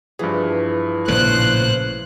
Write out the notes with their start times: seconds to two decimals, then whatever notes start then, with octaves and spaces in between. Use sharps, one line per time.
0.19 G2 E3 F3 G#4
1.08 A#1 A2 C#3 C5 F#6